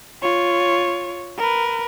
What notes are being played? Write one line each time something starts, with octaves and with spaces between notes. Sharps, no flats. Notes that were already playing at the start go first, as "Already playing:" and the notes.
F4 C#5
A#4 B4